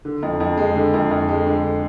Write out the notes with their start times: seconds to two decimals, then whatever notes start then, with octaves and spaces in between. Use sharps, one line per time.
0.05 D3
0.23 F2
0.40 F2
0.57 G#3
0.75 D3
0.94 F2
1.11 F2
1.29 G#3
1.46 D3